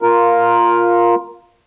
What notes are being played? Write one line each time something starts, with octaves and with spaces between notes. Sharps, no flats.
F4 A#4